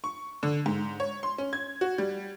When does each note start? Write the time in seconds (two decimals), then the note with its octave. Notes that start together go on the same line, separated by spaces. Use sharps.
0.04 C#6
0.43 D3
0.66 G#2
1.00 C#5
1.23 C6
1.38 C#4
1.53 G#6
1.81 F#4
1.98 G3